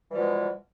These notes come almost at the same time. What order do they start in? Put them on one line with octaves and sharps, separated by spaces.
E3 G3 F3 B2 G#3